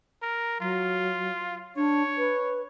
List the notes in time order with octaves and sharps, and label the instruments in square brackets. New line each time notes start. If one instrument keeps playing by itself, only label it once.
[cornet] A#4
[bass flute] F#3 [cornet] F4
[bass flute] D4 [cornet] C#5
[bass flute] B4